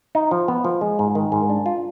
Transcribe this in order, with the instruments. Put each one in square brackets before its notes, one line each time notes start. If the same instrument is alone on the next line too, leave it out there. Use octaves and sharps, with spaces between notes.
[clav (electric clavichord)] D#4
F3
B3
F3
G#3
G#2
D#3
G#2
D4
F4